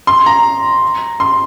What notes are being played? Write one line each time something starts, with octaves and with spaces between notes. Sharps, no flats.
C6
A#5
C6